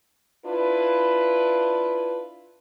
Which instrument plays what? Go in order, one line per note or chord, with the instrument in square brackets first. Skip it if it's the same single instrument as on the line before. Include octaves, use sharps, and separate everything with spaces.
[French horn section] D4 E4 F4 B4